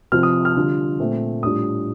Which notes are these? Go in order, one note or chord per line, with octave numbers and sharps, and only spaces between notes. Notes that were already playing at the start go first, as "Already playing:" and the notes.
C3 F3 C4 F4 F6
D#6
F6
D3 G3 D4 F4
A#2 A3 C4
A2 G3 D4 F4 D#6